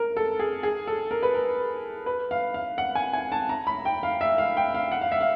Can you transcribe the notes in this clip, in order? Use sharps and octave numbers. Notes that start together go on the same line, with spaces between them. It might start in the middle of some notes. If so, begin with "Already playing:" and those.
Already playing: A#4
A4
G#4
G#4
A4
A#4
B4
A#4
B4
F5
F5
F#5
G#5
G#5
A5
A#5
B5
G5
F5
E5
F5
G5
F5
F#5
F5
E5
F5